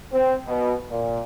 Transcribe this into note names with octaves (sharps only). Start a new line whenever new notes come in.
C4
B2
A#2